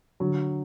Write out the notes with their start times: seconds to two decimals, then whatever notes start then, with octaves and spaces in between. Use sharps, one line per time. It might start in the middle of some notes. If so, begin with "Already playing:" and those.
0.20 D3 F#3